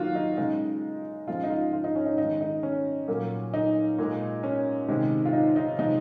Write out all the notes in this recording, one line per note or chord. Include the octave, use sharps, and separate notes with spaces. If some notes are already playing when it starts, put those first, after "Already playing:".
Already playing: D#3 F#3 A#3 F4 F#4
D#4
C#3 G#3 D#4
C#3 F3 G#3 F4
D#4
F4
F4
D#4
C#4
D#4
D#3 G#3 D#4
D#4
C#4
A#2 F#3 A#3
D#4
A#2 G#3
C#4
C3 D#3 G#3
F4
D#4
D#4
C3 F3 G#3 D#4